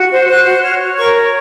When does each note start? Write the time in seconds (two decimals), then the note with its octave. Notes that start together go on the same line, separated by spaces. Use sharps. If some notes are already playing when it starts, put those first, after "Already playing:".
Already playing: F#4
0.11 C5
0.28 C5 F#6
0.46 F#4
0.55 F#6
0.63 C#5 F6
0.80 C#5
0.97 A#4 C#6
1.14 C#5